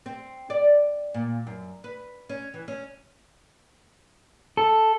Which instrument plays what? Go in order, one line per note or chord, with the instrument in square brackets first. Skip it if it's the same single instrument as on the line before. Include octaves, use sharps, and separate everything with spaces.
[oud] C4
D5
A#2
F#2
B4
C#4
E3
C#4
[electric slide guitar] A4